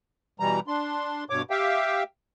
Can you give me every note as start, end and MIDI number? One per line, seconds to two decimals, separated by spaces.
0.40 0.60 47
0.40 0.60 52
0.40 0.60 55
0.40 0.60 82
0.68 1.24 62
0.68 1.24 84
1.30 1.42 43
1.30 1.42 47
1.30 1.42 73
1.30 1.42 86
1.50 2.03 67
1.50 2.03 76
1.50 2.03 77
1.50 2.03 79